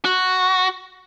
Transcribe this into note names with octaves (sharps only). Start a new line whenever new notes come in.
F#4